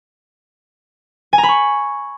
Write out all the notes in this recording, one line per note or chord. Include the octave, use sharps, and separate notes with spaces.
G#5
A#5
B5
C#6